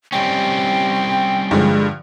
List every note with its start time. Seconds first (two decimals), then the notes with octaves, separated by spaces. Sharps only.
0.12 G3 C4 C#4 G5
1.51 G2 D3 F3 G#3